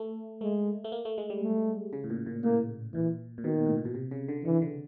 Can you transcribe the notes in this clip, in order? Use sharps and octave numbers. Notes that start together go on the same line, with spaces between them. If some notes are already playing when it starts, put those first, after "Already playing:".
Already playing: A3
G#3 A3
A3
A#3
A3
G#3
G3
A3
C#3
A2
A#2
A#2
A2 A#3
A#2 E3
A#2
B2 D#3
A2
A#2
B2
C3
C#3
D3
D3 E3
D3